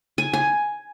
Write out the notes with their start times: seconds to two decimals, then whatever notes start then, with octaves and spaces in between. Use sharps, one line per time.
0.18 G#5
0.33 G#5